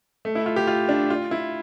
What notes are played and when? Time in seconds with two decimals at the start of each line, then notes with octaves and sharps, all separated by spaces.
0.25 A3
0.35 E4
0.46 F4
0.56 G4
0.67 F4
0.89 D4
1.10 F4
1.31 E4